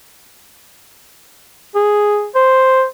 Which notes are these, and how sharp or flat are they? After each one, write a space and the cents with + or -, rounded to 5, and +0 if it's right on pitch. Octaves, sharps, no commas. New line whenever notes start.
G#4 +0
C5 +0